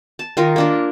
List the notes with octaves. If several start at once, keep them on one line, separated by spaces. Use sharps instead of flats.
A5
D#3 F4 A#4
A#3 D4 A#4